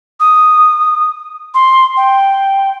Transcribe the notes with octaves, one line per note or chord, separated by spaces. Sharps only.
D#6
C6
G5